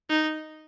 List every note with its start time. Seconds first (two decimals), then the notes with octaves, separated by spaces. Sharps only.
0.10 D#4